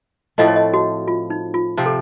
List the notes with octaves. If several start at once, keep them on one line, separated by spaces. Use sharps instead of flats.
A2 F3 A3 C4 D#5
C#5
D#5
F#4
F4
D#4
F4
C3 F3 C4
A4